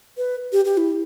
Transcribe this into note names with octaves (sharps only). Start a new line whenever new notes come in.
B4
G4
G4
E4